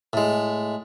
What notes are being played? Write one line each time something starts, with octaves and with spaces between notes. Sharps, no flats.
A2 G#3